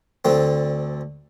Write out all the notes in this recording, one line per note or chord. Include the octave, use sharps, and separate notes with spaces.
D2 D3 C4